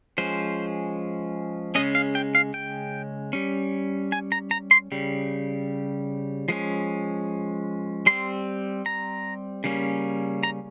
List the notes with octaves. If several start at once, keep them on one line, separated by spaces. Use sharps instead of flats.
F3 G#3 C#4 C5
C#3 G#3 C#4 D#5
F5
G5
F5
G5
G3 C#4
G#5
A#5
A#5
C6
C#3 G3
F3 G#3 C#4
G3 C4 C6
A#5
C#3 G3 A#3 C#4
A#5